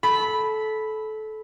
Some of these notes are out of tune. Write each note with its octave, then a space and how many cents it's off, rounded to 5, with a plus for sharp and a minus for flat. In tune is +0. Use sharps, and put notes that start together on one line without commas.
A4 -20 B5 +0